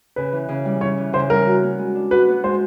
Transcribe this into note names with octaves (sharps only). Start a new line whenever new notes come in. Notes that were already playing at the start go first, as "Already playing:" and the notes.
C#3 B4
E3
C#3
G3
C#3 C#5
E3
C#3 C5
G3 A#4
F#4
B3
G#3
D4
F#4 B4
B3
G#3 C5